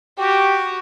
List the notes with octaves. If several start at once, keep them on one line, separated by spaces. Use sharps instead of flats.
F#4 G4